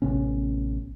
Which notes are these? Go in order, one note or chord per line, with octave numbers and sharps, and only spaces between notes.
A1 C3 B3 C#4